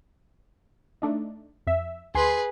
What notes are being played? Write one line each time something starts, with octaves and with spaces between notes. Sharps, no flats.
A3 D4 D#4
F2 E5
D2 G#4 B4 G#5 C6